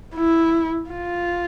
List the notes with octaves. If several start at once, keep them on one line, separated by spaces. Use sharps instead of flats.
E4
F4